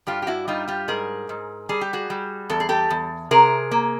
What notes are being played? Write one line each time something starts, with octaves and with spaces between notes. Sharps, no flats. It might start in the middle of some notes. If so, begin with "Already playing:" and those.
G2 F4 G4
G4
E4 F#4
G3 D#4 F4
F4 G4
G#2 G#4 A#4
G#2
G3 G#4
G4
F#4 G#4
G3
E2 A4
G#4
G4 A4
E2
C3 G#4 A#4
A#3